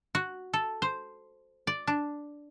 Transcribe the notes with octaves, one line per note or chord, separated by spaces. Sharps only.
F#4
A4
C5
D5
D4